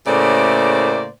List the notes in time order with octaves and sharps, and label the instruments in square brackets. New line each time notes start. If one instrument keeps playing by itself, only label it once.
[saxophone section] A2 C#3 A3 A#3 C5 D5